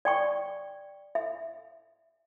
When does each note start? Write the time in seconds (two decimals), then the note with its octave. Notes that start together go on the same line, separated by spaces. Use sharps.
0.05 D5 G5 C#6
1.15 E5